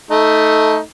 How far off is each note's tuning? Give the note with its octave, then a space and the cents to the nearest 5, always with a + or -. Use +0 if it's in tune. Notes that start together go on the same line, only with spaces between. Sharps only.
A3 +0 D#4 +15